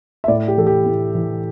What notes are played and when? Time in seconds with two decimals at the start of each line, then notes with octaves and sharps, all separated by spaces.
0.24 E5
0.28 A2 D5
0.48 G4
0.57 E3 A4
0.66 G4
0.86 A2
1.15 E3